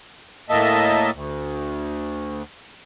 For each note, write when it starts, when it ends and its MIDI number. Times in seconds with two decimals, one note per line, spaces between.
0.50 1.11 45
0.50 1.11 58
0.50 1.11 75
0.50 1.11 76
0.50 1.11 81
1.13 2.43 38